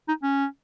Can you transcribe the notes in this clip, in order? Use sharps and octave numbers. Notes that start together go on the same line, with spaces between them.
D#4
C#4